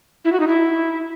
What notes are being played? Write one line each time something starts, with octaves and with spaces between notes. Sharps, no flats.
E4
F#4
D#4
E4